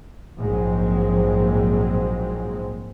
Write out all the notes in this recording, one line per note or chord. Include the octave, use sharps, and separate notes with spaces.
A#1 G#2 F3 F#3 G#3 C4